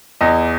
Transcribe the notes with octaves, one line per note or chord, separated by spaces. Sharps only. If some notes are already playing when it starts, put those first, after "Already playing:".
E2 D#5